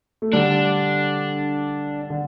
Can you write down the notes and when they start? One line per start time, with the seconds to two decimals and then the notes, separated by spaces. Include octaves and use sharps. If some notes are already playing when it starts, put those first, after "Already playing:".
0.22 A3
0.33 D3 G3 D4
2.10 D3